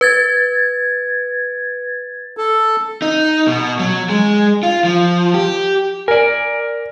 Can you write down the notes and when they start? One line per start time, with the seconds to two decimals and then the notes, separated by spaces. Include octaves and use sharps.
0.01 B4 G#6 A6
2.37 A4
3.02 D#4
3.47 B2
3.79 F#3
4.09 G#3
4.63 F4
4.84 F3
5.34 G4
6.08 A#4 D5 G#5